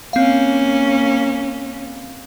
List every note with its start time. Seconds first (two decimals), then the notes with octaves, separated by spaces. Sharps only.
0.13 A#3 C4 C#4 F5